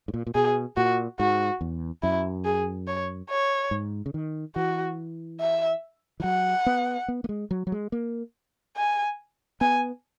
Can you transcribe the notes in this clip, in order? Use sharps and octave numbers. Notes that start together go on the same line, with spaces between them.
G#2
A#2
A#2
B2 G#4
A#2 F#4
G#2 F#4
E2
F#2 E4
G#4
C#5
C#5
G#2
C#3
D#3
E3 F#4
E5
E3
F#3 F#5
B3
B3
A#3
G#3
F#3
F#3
G#3
A#3
G#5
B3 G#5